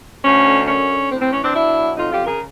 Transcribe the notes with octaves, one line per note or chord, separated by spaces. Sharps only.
D2 C#4
D3
F#2 C#4
D3
A2 C4
C4
E3 C#4
C4 D4
B2 D4 E4
F#3
F2 D#4 F4
F4 G4
C#3
G#4 A#4